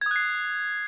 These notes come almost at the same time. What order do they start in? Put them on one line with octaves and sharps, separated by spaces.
G#6 D#6 F#6 C7